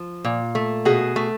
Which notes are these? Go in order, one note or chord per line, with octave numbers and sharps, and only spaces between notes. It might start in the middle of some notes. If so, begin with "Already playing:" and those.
Already playing: F3
A#2
A3
B2 F#4 G#4
A3